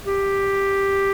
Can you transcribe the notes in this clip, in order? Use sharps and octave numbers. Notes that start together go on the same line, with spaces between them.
G4